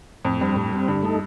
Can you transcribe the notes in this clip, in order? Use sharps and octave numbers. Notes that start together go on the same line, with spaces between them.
F2 A2
G2 G3 C4
A2
G3 C4
G2 D3
A3 D#4 A4